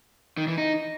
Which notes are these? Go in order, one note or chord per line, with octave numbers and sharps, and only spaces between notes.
D#3
E3
D#4